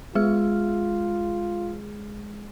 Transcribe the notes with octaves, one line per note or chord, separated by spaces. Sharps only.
G#3 F4 G#4 F6